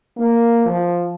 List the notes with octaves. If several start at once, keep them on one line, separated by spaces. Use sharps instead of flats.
A#3
F3